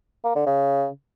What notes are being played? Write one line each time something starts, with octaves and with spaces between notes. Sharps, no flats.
A#3
D3
C#3